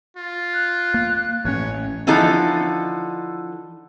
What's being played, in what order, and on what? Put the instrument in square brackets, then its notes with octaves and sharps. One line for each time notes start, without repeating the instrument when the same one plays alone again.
[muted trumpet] F4
[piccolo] F#6
[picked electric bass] A#3
[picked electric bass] A1 C#4 [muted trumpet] C#5
[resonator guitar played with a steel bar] D3 E3 F3 D#4 A4